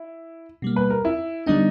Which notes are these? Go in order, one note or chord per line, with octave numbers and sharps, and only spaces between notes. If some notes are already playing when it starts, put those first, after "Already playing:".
Already playing: E4
B2 G3 A#3
B4
A#4
E4
D3 G3 B3 D4 D#4